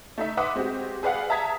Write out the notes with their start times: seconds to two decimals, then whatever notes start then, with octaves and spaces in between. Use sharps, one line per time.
0.18 A3 D#4 E5
0.37 B4 E5 F#5 C6 D6 D#6
0.55 G#3 C4 F#4 G4
1.03 G#4 B4 D5 F5 F#5
1.30 E5 A5 A#5 D#6 G#6 B6